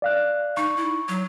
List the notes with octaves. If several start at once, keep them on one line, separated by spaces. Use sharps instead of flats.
D5 F5 F#6
D#4 C#6
E4
F#3